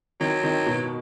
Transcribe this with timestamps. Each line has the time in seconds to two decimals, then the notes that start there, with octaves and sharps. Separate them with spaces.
0.21 D#3 F#3
0.43 D#3
0.66 B2